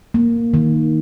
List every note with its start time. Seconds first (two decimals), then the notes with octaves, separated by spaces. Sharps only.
0.14 A#3
0.54 D#3